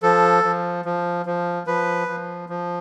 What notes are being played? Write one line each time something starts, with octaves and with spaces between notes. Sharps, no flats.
F3 A4
F3
F3
F3
F3 B4
F3
F3